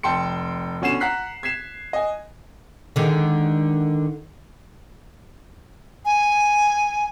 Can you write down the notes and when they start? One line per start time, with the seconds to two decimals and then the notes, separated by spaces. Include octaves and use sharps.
0.03 F1 G5 A5 C6 C#7
0.82 B2 D3 C#4 F#5 C7 E7
1.00 F#5 A#5 F#6 B6 C7
1.43 G#6 B6 C7 E7
1.93 D#5 G#5
2.96 D3 D#3 G#3
6.05 G#5